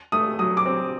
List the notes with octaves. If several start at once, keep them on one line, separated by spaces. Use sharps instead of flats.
A3 D#6
F#3 D#6
D6
C4